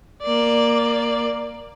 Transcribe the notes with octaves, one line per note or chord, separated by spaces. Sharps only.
A#3 D5